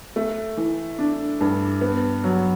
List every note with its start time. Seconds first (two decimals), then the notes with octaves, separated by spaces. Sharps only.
0.16 A3
0.57 E3
0.99 D4
1.41 G2
1.81 B3
2.24 F#3